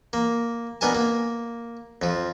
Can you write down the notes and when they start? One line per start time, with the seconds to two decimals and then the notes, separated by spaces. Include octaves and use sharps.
0.13 A#3
0.81 B2 D4 A#4 G#5 A5
0.95 A#3
2.02 F2 F3